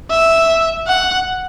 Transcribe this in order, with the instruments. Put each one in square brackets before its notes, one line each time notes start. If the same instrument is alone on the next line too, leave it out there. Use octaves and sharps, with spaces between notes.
[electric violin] E5
F#5